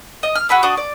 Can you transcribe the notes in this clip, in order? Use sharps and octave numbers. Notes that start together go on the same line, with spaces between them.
D#5
F6
F#4 G#4 B5 E6
D4 F#4 D#6
D5